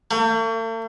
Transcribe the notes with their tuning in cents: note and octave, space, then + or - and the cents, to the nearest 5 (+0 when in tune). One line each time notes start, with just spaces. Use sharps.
A3 +45